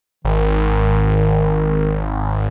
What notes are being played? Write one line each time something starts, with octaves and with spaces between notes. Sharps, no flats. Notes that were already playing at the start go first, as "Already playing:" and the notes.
G#1 D#3